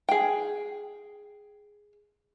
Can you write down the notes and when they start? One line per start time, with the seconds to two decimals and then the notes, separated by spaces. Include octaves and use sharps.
0.09 G#4 G5